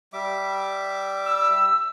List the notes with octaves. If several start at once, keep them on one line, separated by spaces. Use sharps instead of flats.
G3 E5 D6
E6